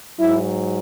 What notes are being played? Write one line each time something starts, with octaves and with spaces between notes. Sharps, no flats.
G#2 F#3 E4